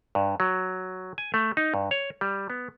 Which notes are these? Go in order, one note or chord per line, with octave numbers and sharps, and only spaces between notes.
G2
F#3
G#5
A3
D#4
G2
C#5
G3
B3